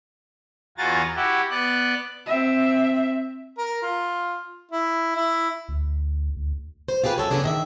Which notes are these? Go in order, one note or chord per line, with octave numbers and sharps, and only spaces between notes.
E2 F4 F#4 G#5 A#5 A6
E4 F#4 G4
B3 D5 F#6
C4 E5
A#4
F4
E4
E4
D2
D2
C5
F4 G4 G#4 B4
F#2 A4 C#5
C#3 B3 D4 G#4
D#3 D#5 E5